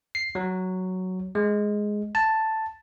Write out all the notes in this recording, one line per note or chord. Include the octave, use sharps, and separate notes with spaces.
C7
F#3
G#3
A5